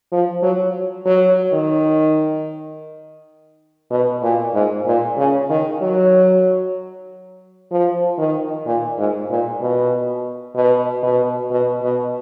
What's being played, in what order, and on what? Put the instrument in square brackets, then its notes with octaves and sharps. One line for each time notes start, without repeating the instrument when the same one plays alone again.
[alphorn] F3
F#3
F#3
D#3
B2
A#2
G#2
A#2
C#3
D#3
F#3
F3
D#3
A#2
G#2
A#2
B2
B2
B2
B2
B2